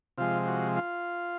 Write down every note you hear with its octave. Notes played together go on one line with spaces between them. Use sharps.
C3 F3 G#3 F4
F#4
F4